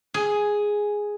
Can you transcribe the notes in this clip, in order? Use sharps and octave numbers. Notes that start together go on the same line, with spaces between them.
G#4